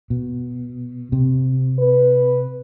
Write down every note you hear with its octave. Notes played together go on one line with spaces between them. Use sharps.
B2
C3
B4